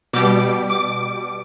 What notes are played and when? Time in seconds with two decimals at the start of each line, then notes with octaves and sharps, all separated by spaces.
0.13 B2 G3 D6
0.70 D6